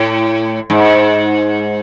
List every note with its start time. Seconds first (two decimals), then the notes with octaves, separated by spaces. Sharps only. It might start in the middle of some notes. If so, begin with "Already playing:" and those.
Already playing: A2
0.70 G#2